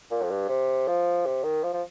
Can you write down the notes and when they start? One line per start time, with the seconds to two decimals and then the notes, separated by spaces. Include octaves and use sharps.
0.11 A#2
0.23 F2
0.30 G2
0.49 C3
0.88 F3
1.26 C3
1.44 D#3
1.63 F3
1.73 F3